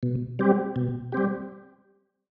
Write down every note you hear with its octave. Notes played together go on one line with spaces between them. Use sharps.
B2
G3 C4 G4
B2
G3 C4 G4